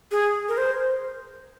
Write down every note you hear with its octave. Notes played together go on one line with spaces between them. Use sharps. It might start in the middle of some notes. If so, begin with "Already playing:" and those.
G#4
A#4
C5